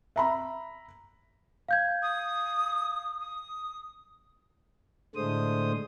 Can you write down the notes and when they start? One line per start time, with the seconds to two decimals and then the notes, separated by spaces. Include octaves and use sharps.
0.16 E5 A#5 B5
1.69 F5 G6 G#6
2.02 D#6
3.20 D#6
5.15 A2 D3 G#3 A3 C5 D#6